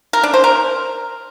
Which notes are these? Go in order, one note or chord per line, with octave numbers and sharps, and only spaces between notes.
A#4
D4
C5
A#4